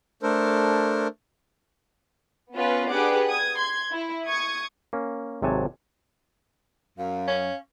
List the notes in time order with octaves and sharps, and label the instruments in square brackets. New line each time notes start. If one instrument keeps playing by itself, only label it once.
[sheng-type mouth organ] A3 D4 A4 A#4 C5
[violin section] B3 C#4 F4 B4
D4 G4 G#4 B4 F#5 D6
D#6 G#6
C6 G#6
E4
C#6 D#6 G#6
[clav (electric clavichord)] A#3 C#4
G#1 C3 F#3 C#5 G#5 A5
[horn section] F#2 [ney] F5
[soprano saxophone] C#4